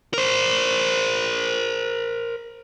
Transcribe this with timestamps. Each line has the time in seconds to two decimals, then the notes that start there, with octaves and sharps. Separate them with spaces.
0.14 A#4 C5